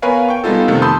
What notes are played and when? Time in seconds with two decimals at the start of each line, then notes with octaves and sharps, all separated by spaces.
0.02 B3 A#4 B4 C#5 F5 G#5
0.28 G5 C#6
0.44 G3 G#3 B3 D#4 F4 A4
0.68 F2 C3 D#3 A3
0.82 A5 B5 C6 D#6 E6 G6